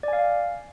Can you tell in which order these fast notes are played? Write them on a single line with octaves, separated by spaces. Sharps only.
D5 G#5 F5